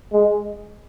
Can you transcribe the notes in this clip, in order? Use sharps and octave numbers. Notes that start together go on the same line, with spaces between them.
G#3